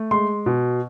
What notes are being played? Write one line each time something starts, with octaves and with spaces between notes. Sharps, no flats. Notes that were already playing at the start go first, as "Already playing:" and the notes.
Already playing: A3
G#3 C6
B2